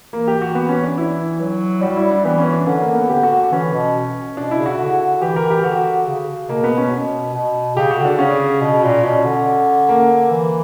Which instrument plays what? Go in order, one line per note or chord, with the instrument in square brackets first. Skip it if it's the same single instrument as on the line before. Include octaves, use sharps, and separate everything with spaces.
[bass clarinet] E3 [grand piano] A#3
[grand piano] G4
F#4
B3
C#4
D4
E4
[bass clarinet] F#3
[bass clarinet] G3 [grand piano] F#4
[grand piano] E4
D4
[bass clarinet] E3 [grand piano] B3
[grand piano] C#4
D4
[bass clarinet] D3 [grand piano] C#4
[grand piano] A#3
B3
[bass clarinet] D3 [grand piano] G4
[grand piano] F#4
[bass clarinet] E3 [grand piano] C#4
[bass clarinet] B2
[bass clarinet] B2 [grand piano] D4
[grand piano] E4
[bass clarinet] C#3
[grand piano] F#4
[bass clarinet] D3
[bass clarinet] E3 [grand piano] G4
[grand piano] A#4
G4
[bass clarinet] D3 [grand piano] F#4
[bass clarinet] C#3
[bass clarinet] B2 [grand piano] A#3
[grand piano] B3
C#4
[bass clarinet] B2
B2
[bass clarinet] C#3 [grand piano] G4
[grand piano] F#4
[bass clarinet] D3
[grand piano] D4
[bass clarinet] C#3 [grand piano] C#4
[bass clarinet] B2
A#2
[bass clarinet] B2 [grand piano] C#4
[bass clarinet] D3
[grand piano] A#3
[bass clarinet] E3